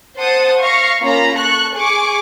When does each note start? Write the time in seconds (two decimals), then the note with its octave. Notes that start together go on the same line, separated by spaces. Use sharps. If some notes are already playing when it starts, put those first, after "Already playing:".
0.17 C5 F#5 A5 D#6
0.61 F5 C#6 A#6
1.02 A#3 C#4 F4 A#5 B5
1.35 A4 C#6 F#6
1.75 G#4 G#5 C#6 D6